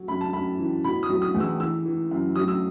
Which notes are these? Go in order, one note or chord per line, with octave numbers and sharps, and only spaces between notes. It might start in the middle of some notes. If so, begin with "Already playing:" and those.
Already playing: F#3
F#2 B5
A5
F#2 B5
E3
B2 B5
D#6
F#3
D#6
E2
E6
E3 E6
E3
F#2
F#3 D#6
E6